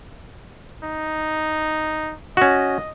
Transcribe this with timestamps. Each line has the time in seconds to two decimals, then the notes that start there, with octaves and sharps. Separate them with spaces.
0.83 D#4
2.37 C#4 F#4 D#5